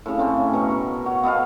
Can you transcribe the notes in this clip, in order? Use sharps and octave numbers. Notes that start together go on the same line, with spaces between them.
A2 C#3
C#3 A3 C4 C#4
B2 A#4 C#6
C#6
F#4 C#5
B3 A4 D#5 F5